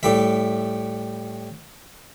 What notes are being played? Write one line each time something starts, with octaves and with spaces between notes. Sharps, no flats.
A2 G3 E5